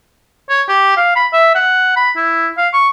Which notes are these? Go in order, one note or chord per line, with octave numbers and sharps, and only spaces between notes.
C#5
G4
F5
B5
E5
F#5
B5
E4
F5
C#6